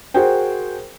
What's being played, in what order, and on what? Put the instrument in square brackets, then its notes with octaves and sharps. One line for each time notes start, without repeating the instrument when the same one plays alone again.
[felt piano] F#4 G#4 A#4 C5 G5